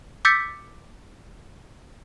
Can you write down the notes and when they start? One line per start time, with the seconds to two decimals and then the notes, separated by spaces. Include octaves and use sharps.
0.25 D6 E6 G6 A6 B6 C#7